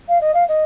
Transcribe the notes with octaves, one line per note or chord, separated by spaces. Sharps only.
F5
D#5
F5
D#5